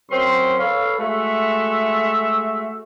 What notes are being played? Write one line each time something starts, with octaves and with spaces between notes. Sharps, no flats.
F#2 C4 C#4 C6
A4 B4 C#5 F5
G#3 A3 F#4 E5